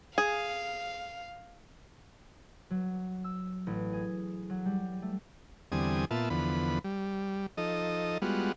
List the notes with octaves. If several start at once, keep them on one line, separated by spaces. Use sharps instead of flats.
G#4 F5
F#3
E6
A1
G#4
F#3
G3
A3
E2 D3 G3 C4 G#5 D#6
A#2 B3 F4 E5 A5
E2 D3 F3 B3 B5
G3
F3 D#4 A4 D#5
G3 G#3 B3 F4 F#4